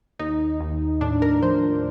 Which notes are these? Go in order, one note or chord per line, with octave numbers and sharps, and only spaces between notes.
D#2 D#4
D#2
A2 D4
A#4
F3 C5